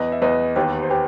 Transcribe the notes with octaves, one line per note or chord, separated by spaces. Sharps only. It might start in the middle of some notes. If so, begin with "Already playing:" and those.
Already playing: E2 B4 D#5
E5
E2 B4 D#5
D#2 G4 B4
C5
G4 B4